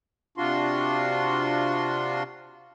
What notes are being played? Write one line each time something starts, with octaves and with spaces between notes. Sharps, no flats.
C3 D4 F4 F#4 C6